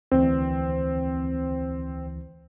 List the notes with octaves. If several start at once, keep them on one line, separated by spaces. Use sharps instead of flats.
D2 E3 C4